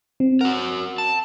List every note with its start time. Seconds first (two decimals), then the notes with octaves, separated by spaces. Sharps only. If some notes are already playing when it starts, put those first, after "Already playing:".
0.20 C4
0.41 F#4 A#4 F#5
0.98 A5